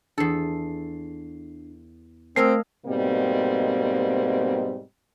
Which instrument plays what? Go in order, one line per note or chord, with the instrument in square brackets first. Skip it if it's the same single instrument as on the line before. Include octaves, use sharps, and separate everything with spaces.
[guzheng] E2 A4 [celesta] D4 C7
[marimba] A3 E6 [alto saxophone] C4 [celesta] A#4 [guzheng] D#5 F5 G#5
[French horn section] G#2 B2 G3 A#3 C4